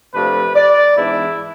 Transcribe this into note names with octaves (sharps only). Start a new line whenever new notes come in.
C3 F3 A3 D4 B4
D5
G#2 E3 B3 D4 E4